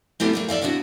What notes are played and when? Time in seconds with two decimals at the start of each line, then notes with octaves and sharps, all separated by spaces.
0.20 A3 B3 C4 E4 F4 G4
0.33 G3 A3 A#3
0.49 A4 D5 E5 F5
0.61 B3 C4 D4 E4 F#4